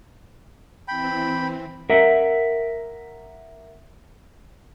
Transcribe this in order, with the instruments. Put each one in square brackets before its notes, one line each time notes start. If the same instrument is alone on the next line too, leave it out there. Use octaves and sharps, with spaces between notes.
[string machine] E3 C4 [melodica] G5 B5
[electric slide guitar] A#4 E5 F#5